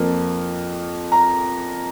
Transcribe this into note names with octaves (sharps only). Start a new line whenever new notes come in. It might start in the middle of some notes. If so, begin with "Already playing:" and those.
Already playing: F2 F3 A#3
A#5